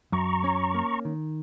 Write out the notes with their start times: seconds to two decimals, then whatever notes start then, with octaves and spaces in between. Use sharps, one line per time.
0.12 F#2 A#5 C#6
0.44 C#4
0.75 A#3
1.05 D#3